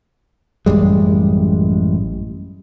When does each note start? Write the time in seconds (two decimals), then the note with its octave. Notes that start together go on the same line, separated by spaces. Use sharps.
0.66 A1 F#2 G3 G#3